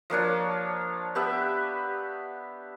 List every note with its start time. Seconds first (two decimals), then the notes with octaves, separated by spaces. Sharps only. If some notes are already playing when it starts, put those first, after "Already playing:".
0.10 F3 A#3 D4 C#5
1.15 B3 G4 B4 E5